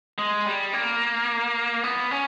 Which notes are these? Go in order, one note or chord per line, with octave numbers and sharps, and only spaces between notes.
G#3
G3
A#3
B3
C#4